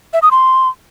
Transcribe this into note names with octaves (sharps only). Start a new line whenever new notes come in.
E5
D#6
C6